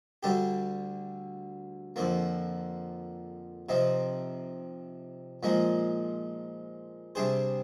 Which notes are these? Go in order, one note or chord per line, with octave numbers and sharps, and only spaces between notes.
D2 D3 G3 D4 G4
F2 D3 F3 A#3
C3 F3 C4 D#4
A#2 F3 G#3 D#4
C3 G3 D4 G#4 C5